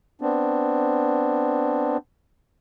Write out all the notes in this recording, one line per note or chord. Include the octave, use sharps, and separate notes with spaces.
B3 C4 D4